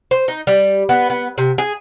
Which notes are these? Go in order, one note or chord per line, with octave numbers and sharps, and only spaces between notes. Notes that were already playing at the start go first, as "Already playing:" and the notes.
C5
D#4
G3
B3
B3
C3
G#4